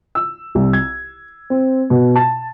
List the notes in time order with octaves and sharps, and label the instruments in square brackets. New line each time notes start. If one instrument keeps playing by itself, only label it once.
[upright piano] E6
C2
G#6
C4
B2
A5